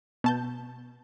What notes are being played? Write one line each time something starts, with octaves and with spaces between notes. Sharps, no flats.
B2 A5 G6